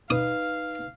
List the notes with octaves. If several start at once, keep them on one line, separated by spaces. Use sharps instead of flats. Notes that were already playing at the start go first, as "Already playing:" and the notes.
D#4 B4 F5 D#6